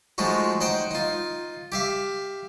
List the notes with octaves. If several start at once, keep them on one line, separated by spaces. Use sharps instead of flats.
F3 G#3 A3 D#4 F#4
D#4 C5 F#5 G5
D#4 F4
G4 E5 F5